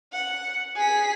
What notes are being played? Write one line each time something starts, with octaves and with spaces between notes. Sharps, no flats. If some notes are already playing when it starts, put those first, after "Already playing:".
F#5
G#4 B6